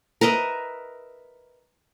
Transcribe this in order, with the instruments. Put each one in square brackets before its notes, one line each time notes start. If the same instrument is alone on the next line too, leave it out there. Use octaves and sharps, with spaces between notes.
[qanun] A#4 B4 D#5 E5